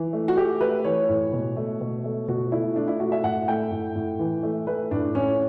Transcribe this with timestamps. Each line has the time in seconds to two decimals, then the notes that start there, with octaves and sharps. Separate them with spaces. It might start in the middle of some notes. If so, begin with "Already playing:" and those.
Already playing: E3
0.13 A3
0.28 F#4
0.37 A3 G4
0.61 A3 B4
0.84 E3 C#5
1.09 A2
1.33 B2
1.57 A3
1.81 B2
2.04 A3
2.28 B2 F#4
2.52 A3 E4
2.76 A3 D4
2.88 E4
3.00 A3 F#4
3.12 E5
3.23 A2 F#5
3.48 A3 G5
3.71 A2
3.95 A2
4.19 E3
4.43 A3
4.67 A3 B4
4.91 A2 D4
5.15 A2 C#4